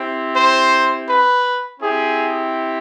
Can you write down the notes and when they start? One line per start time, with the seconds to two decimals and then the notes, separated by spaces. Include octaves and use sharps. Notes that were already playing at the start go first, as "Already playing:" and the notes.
Already playing: C4 E4 G4
0.36 C5
1.09 B4
1.81 C4 E4 G4 G#4